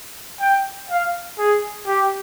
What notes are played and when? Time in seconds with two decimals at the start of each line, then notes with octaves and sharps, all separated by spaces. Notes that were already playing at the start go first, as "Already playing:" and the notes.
0.40 G5
0.90 F5
1.38 G#4
1.87 G4